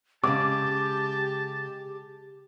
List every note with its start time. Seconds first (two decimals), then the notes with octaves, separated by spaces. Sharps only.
0.24 C#3 G#3 G4 A5 D6